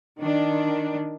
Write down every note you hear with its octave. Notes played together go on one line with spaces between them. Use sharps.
D#3 D4